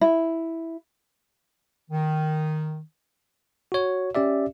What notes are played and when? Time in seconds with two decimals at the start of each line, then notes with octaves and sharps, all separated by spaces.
0.01 E4
1.91 D#3
3.72 F#4 C#5
4.15 C#4 G4 D5 E5